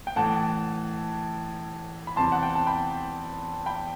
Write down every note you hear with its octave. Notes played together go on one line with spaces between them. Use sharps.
G5
A2 E3 F#5 A5
B5
E2 C3 E3 A5 C6
F#5
G5
A5
G5 B5
G5 B5